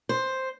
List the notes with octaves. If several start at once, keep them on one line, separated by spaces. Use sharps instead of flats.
C5